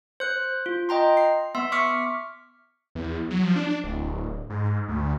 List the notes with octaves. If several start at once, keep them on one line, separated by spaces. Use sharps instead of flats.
C5 F#6
F4
D#5 G5 A#5 C6
C7
B3 E5 C6 E6
E5 C#6 D6 F6 B6 C#7
E2
F#3
F3
D4
D1
G#2
D2